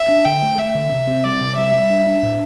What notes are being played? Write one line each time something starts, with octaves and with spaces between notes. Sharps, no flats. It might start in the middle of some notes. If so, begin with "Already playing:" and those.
Already playing: E5
D4
D3 G5
A3
A3 E5
D3
C3
C4
G3 D5
C3
G3 E5
G3
D4
D4
A2